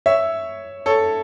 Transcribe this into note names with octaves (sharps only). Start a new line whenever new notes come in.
C#5 E5
A4 C#5